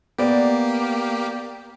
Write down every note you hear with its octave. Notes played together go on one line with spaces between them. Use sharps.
A#3 B3 G4 D5